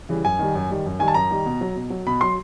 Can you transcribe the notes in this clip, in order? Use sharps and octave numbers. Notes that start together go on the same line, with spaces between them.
C#3 E3 G3
F#2 G#5
D#3 G3
F#2
D#3 G3
F#2
D#3 G3 G#5
A5
F#2 A#5
D#3 G3
B2
F#3
B2
F#3
B2 B5
F#3 C6